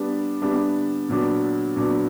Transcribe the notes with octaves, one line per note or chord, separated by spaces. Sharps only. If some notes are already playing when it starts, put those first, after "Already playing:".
Already playing: G3 B3 D4
G3 B3 D4
A#2 F#3 B3 D4
A#2 F#3 B3 D4